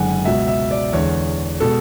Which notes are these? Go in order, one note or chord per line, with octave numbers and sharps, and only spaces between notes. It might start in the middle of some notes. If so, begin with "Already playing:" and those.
Already playing: F#1 F#2 D3 G#3 F#5 G#5
C#2 B2 F#3 E5
E5
D5
E2 D3 G#3 C#5
B2 G#3 A4